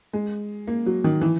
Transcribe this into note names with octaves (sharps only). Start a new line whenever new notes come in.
G#3
A#3
F#3
D#3
E3